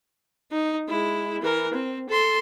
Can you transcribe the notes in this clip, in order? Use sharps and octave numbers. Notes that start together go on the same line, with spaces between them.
D#4
G#3 E4
E3 A#4
C4
A4 C6